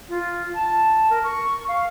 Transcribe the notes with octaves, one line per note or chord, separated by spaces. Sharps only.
F4
A5
A#4
C#6
F5